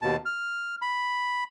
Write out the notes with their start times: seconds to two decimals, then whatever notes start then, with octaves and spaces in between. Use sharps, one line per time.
0.02 D#2 B2 A5
0.25 F6
0.82 B5